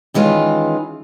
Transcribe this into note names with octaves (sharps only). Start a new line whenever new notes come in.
D#3 E3 G#3 C#4 F4